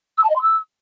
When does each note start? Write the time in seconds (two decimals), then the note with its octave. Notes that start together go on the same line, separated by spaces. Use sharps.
0.18 E6
0.24 A5
0.30 D#5
0.36 C6
0.42 E6